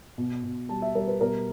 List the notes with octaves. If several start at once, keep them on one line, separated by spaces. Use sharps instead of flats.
B2
B2
G3 A5
E5
G3 A#4
B4
B2 A#4